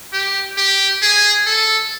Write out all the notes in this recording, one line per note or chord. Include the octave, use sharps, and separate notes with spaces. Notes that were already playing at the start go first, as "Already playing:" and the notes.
G4
G4
G#4
A4